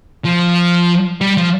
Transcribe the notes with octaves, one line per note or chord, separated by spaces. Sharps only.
F3
G3
F3